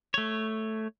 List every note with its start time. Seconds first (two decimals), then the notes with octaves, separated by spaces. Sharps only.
0.14 A3 C#5